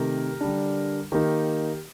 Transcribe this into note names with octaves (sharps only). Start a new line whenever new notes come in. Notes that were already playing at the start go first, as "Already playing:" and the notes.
Already playing: C3 D#3 A3 G4 A#4
D3 G3 D4
D#3 A#3 D#4 G4 A#4